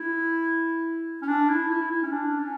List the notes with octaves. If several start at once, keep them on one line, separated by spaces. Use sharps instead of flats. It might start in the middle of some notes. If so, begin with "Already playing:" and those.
Already playing: E4
C#4
D4
E4
E4
E4
C#4
D4
C#4